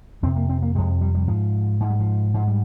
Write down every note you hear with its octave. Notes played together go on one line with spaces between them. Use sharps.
F2 C3 C4
A#3
C4
A#3
F2 C3 G#3
G3
G3
G#2 F3
G#2 F3
G3
F3
G#2 F3
G3